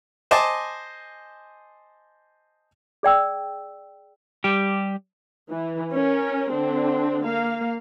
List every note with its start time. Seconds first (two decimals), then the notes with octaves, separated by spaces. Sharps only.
0.31 C5 D#5 G#5 A5 D6
3.03 G#4 D5 G5 E6
4.44 G3 G4
5.50 E3
5.92 C#4 A#4
6.53 D3 C4 D4
7.25 A#3 F5